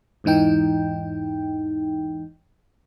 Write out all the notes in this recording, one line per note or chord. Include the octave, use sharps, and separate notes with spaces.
E2 G#2 E3 D#4 G5